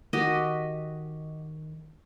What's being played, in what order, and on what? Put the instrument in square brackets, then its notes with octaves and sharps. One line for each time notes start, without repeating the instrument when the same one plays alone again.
[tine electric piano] D#3 [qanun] F#4 G4 D#5